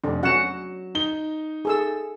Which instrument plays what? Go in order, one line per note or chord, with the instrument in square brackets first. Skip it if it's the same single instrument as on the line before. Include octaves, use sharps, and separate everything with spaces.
[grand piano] F1 [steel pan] D4
[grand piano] F#3 E7 [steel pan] C#4 F#4 F#5
[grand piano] D#4 G7
[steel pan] G#4 A4 E6